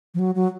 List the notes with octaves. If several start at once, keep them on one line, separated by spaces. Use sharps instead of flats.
F3
F#3
F#3